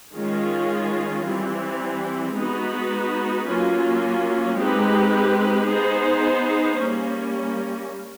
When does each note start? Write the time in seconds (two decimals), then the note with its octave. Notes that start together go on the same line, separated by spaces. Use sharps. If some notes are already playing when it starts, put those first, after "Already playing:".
0.16 D#3 G#3 C#4 F4
1.26 E3 G3 C4
2.37 G#3 B3 D#4 F#4 B4
3.48 F#3 A#3 C#4 F4
4.58 G#3 C4 D#4 G4 B4
5.68 B3 D#4 G#4 C5
6.79 G3 A#3 C#4